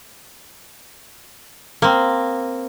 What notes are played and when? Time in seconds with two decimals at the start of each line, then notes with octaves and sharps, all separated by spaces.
1.82 A#3 C4